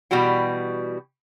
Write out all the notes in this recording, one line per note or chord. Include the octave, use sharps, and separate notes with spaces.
B2 E3 G3 F#4 G5